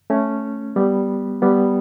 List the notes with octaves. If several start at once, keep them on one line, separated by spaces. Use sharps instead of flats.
A3 C#4
G3 B3
G3 B3